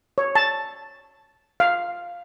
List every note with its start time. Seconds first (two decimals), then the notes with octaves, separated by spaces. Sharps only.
0.18 C#5
0.35 A5
1.60 F5